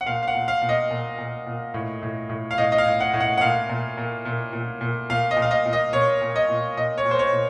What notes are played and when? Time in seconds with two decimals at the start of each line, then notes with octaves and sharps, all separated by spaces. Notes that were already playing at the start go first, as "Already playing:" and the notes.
0.01 F#5
0.06 A#2 F5
0.23 F5
0.28 F#5
0.35 A#2
0.48 F5
0.62 A#2
0.69 D#5
0.91 A#2
1.18 A#2
1.46 A#2
1.74 A2
2.03 A2
2.29 A2
2.51 F5
2.58 A2 D#5
2.72 D#5
2.78 F5
2.85 A2
3.00 F#5
3.13 A2
3.20 F#5
3.38 F#5
3.41 A#2 F5
3.69 A#2
3.98 A#2
4.25 A#2
4.53 A#2
4.81 A#2
5.10 A#2 F5
5.31 D#5
5.37 A#2
5.42 F5
5.51 D#5
5.66 A#2
5.73 D#5
5.93 A#2 C#5
6.21 A#2
6.36 D#5
6.49 A#2
6.77 A#2 D#5
6.98 C#5
7.05 A#2
7.11 C5
7.19 C#5
7.33 A#2